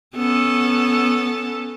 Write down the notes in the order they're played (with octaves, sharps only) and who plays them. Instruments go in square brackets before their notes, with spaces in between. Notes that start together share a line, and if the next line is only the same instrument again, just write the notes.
[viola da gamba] B3 C#4 A4